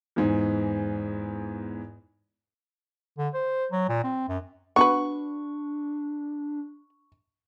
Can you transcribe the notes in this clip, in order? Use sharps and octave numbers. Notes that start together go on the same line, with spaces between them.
E2 G#2
D3
C5
F#3
A#2
C4
F#2
B3 D4 F#4 B4 C#6